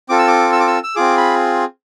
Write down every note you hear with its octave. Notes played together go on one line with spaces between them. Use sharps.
C4 F4 A4 D6
E6
D6
E6
D6
E6
E6
C4 F4 G#4 D6
B5